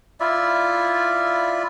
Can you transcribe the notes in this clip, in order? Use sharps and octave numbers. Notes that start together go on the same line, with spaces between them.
E4 F4 D5 E5